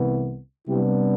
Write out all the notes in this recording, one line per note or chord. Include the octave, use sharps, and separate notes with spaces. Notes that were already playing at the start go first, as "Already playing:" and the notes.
Already playing: C2 C3 E3 B3
C3 G3 B3 D4 E4 G4